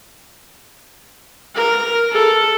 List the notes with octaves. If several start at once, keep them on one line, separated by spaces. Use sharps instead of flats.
A#4
A4